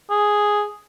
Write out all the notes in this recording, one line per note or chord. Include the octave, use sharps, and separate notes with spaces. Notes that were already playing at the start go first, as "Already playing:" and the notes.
G#4